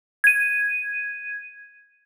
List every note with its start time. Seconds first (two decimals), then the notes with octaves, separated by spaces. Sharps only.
0.24 G#6 D#7